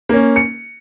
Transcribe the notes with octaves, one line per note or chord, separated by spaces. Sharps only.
A#3 C#4
C#7